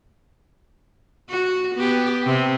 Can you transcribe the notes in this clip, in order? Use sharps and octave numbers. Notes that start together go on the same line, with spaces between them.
F#4
B3 G4
C3